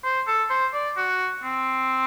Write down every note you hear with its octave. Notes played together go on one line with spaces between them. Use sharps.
C5
A4
C5
D5
F#4
C4